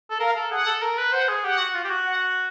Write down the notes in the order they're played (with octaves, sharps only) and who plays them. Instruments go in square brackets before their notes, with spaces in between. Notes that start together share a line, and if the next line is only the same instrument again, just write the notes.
[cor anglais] A4
[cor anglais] A#4 [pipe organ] F5
[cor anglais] A4
[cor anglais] G#4 [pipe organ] F#5
[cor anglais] A4
A#4
B4
[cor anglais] C5 [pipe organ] F#5
[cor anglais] G#4
[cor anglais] G4 [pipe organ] F#5
[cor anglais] F#4
F4
G4
F#4
[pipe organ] F#5